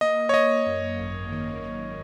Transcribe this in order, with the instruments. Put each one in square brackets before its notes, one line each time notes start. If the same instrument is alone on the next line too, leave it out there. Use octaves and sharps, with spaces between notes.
[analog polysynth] A#3 [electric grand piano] D#5
[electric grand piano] C#5
[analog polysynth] A#3 [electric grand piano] D#5
[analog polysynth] F#2
G#1
D#3
A#3